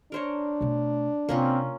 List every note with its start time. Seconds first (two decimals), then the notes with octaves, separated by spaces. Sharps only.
0.12 D4 A#4 C5 C#5
0.61 B2 A3
1.29 C3 A#3 C4 C#4 F4